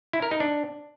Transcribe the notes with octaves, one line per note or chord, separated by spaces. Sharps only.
E4
A#4
D#4
D4